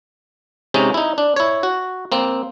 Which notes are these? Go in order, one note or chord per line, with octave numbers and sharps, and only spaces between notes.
C3 G#3 C#4 D#4
D#4 E4
D4
E4 C#5
F#4
A#3 C4